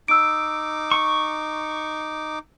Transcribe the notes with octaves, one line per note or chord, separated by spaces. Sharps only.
D#4 D6 E6 D7
C#6